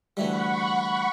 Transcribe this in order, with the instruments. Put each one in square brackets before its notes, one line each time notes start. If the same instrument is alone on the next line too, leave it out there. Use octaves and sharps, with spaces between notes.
[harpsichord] D2 E3 G3 [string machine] F#5 B5 C#6